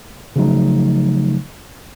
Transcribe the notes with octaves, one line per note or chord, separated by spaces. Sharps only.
C#3 F3 F#3 A3 D#4